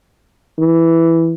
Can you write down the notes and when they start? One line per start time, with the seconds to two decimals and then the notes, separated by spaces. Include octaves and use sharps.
0.58 E3